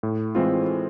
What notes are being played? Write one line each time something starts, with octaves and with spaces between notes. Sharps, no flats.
A2
E3 G#3 C4 F4